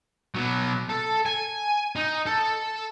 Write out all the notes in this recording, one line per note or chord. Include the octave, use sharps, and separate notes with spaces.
B2 F#3
A4 A5
G#5
D#4
A4